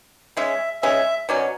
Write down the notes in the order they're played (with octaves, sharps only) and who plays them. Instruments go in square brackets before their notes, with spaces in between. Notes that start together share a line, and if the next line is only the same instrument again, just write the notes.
[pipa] C#3 G#3 C#4 [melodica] E5
[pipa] C#3 G#3 C#4 [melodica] E5
[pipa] B2 F#3 C#4 [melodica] D5